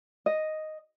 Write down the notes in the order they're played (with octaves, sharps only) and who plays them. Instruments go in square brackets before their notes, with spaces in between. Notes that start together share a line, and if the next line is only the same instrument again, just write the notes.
[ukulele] D#5